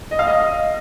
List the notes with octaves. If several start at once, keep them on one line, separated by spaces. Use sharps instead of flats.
D#5
F5
D#5